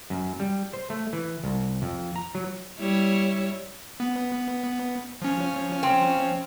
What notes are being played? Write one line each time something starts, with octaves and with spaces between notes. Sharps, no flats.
F#2
G3
C5
A3
E3
C2
F2
A#5
F#3
G3 E4 C#5
B3
F3 C#4
C4